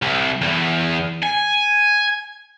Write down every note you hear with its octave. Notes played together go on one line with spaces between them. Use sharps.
C2
E2
G#5